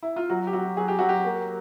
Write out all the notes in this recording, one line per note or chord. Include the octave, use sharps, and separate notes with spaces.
E4
F4
F#3 F#4
G4
F#3 F#4
F#3 G#4
G4
F#3 F#4
G4
A#3